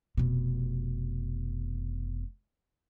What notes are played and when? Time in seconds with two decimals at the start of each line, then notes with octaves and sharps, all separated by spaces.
0.17 F1 B2